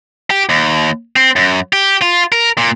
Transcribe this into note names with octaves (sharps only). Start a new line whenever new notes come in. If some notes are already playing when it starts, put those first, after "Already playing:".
G4
D#2
C4
F#2
G4
F4
A#4
A#2